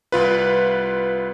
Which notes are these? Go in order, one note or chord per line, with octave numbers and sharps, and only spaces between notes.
C2 F4 B4